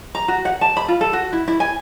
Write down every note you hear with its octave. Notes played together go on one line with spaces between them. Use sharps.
A#5
F#4
F#5
A5
B5
F4
A4
F#4
E4
E4
G#5